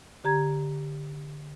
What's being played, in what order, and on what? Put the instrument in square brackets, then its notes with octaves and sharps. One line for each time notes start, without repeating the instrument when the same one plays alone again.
[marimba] D3 G4 A#5 G#6